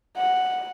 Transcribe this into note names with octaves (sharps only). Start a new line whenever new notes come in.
F#5